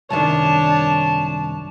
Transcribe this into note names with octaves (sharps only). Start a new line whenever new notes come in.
C2 F#2 D#3 D4 C#5 A5